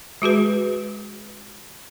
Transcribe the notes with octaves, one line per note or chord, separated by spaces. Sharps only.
G#3 F#4 G#4 B4